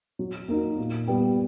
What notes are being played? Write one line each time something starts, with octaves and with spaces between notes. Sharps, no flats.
F#3
A#3 D#4 F#4
A#2
G3 B3